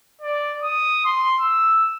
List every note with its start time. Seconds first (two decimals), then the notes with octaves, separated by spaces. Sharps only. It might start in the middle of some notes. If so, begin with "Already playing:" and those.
0.21 D5
0.62 D#6
1.05 C6
1.41 E6